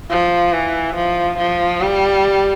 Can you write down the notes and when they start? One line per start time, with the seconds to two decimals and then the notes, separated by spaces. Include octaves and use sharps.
0.10 F3
0.52 E3
0.94 F3
1.38 F3
1.81 G3